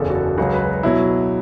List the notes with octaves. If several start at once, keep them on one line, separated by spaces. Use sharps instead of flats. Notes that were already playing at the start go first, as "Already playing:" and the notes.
Already playing: F#1 E2 C#3 A4
F#4
A4
C#2 C#3 F#3 F#4
B4
B2 F#3 E4